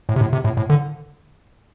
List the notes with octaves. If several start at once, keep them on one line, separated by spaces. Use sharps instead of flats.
A2
C3
A2
C3
A2
A2
D3